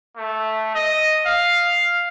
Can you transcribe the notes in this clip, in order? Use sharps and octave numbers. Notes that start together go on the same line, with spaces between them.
A3
D#5
F5